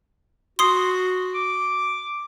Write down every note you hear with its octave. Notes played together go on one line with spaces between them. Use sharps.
F#4 C6 D#6 C7
D6